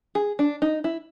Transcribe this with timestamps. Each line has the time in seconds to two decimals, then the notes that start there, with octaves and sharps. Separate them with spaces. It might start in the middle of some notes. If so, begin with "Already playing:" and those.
0.15 G#4
0.39 D4
0.62 D#4
0.84 E4